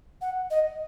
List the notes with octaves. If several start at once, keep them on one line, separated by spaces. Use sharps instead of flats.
F#5
D#5